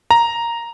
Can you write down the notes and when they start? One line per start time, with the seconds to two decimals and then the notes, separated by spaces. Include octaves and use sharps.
0.11 A#5